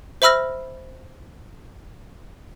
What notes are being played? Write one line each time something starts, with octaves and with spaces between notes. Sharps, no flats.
C5 E5 B5 E6 F6 A#6